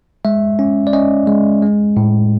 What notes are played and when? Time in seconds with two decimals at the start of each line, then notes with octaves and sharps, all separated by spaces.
0.25 G#3 E5
0.59 C#4
0.87 D5
0.93 C#4 D#5
1.27 G#3
1.62 G#3
1.97 A2